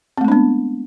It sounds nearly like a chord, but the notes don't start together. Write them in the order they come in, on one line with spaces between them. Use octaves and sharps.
C4 A3 G#3 D4 B3